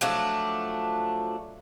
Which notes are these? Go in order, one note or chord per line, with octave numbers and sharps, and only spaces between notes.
F3 F#3 A3 D4